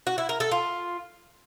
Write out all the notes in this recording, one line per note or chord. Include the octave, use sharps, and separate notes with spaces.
F#4
E4
A#4
A4
F4